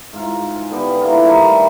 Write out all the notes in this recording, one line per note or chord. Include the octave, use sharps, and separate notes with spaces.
G#2 F4
G#5
D3 B3 G4
A#3 E4 F4
D#3 G3 A3 A#4